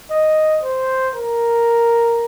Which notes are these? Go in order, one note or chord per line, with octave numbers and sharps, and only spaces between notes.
D#5
C5
A#4